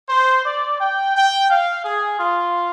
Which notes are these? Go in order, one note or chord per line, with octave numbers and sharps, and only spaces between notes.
C5
D5
G5
G5
F5
G#4
F4